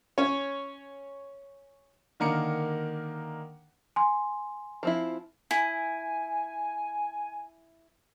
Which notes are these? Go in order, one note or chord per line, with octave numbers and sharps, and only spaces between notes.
C#4 C#5
D3 D#3 A#3 A#5 D6 C#7
G#5 C6
F3 C4 E4
E4 G#5